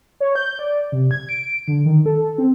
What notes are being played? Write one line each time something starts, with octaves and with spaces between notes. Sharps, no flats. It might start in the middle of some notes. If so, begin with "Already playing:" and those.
C#5
G6
D5
C3
G#6
D7
D3
D#3
A4
C4